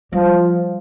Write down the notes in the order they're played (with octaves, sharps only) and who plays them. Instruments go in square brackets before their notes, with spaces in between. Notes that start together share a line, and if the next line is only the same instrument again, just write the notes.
[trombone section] F3 [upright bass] G3